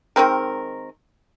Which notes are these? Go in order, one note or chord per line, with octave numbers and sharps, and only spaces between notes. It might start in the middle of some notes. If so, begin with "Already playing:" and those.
D#3 G#3 C4 A#4